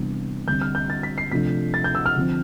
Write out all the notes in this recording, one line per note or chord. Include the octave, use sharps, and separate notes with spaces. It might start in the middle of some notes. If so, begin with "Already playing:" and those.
Already playing: C3 E3 G3 B3 D4
D3 G3 C4 G6
F6
G6
A6
B6
C7
C3 F3 A3 D4 B6
A6
G6
E6
F6
D3 F3 C4